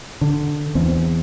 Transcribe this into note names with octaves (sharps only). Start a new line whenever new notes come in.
D3
E2 C4